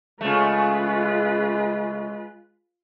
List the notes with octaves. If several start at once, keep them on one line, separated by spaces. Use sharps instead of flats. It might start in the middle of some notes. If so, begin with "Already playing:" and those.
C#3 G#3 A3 F4 B4